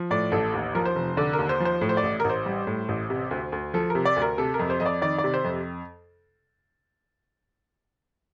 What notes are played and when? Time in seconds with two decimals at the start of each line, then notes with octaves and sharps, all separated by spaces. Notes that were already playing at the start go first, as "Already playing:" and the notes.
Already playing: F3
0.11 A2 D5
0.32 A1 A4
0.54 D#2
0.75 F3 A#4
0.85 C5
0.96 F1
1.17 D3 D5
1.33 A#4
1.39 D#2
1.49 C5
1.60 F3
1.65 C5
1.81 A2
1.89 C5
1.97 D5
2.03 A1
2.20 A1 A#4
2.30 C5
2.46 G3
2.67 A2
2.88 A1
3.10 C3
3.31 D2
3.52 D2
3.74 F3 A4
3.90 C3 A#4
4.05 D5
4.16 D2
4.22 A#4
4.38 C3 A4
4.54 A#4
4.59 F2
4.70 C5
4.80 F2 D#5
4.86 D5
5.02 D#3 D5
5.18 D5
5.24 C3
5.34 C5
5.44 F2